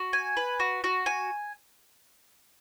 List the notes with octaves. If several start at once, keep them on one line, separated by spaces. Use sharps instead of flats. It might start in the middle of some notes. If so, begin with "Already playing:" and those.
Already playing: F#4
G#5
B4
F#4
F#4
G#5